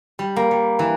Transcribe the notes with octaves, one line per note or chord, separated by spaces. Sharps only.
G3
A#3
G3
E3